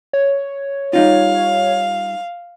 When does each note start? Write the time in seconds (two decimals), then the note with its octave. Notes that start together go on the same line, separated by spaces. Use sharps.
0.13 C#5
0.93 G3 D#4 F4 F5